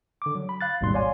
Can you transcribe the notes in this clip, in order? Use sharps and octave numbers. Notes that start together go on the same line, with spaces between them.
D3 D6
F#3
B5
F5 F#6 A6
A1 D#2 G#2 B2 G3 C6
C#5 D5 F5 G#5 C6